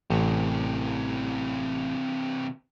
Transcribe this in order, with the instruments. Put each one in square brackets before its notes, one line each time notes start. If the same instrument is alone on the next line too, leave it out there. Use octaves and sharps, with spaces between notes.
[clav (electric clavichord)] A1 [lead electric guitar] C3 E3